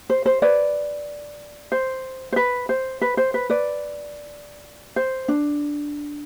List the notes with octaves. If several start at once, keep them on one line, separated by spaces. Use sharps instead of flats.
C5
C5
B4 D5
C5
C5
B4
C5
B4
C5
B4
B4 D5
C5
D4